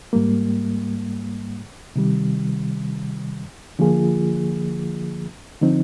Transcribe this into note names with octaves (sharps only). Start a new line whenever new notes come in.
G#2 G3 A#3
C3 D#3 G3
D3 F3 A#3 F4 G#4
D3 F3 C4 D#4